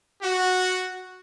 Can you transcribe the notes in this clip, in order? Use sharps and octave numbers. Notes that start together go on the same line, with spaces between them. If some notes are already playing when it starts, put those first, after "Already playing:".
F#4